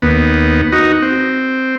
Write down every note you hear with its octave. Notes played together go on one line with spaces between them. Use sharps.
D#2 B3
D#4 F#4
C4